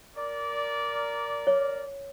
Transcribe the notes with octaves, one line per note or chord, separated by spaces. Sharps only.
A#4 D5
C#5